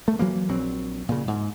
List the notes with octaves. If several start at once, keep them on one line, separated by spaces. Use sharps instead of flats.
A3
E3 F#3 G3 A#3
A#1 F#3 C4
A#2 C#3
G#2